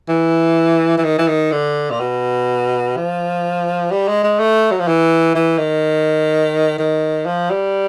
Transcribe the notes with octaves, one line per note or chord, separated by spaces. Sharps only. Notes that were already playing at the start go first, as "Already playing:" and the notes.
E3
E3
D#3
E3
D#3
D3
A#2
B2
F3
G3
G#3
G#3
A3
F#3
F3
E3
E3
D#3
D#3
F3
G3